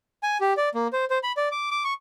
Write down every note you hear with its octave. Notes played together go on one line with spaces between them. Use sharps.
G#5
G4
D5
A#3
C5
C5
B5
D5
D6
D6
C#6